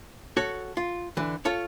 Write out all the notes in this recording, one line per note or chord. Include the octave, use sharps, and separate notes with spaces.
F#4 A4 C#5
F4
D3 E3
F4 A4 C#5